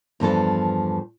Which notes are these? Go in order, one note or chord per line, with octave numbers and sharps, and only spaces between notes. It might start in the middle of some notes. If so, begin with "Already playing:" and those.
E2 G2 F3 A4